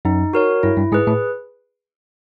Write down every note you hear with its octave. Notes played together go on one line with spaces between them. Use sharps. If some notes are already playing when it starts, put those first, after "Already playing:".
F#2 D#4
F#4 A#4 C#5
G2 E4
G2
G#2 G#4 B4
A2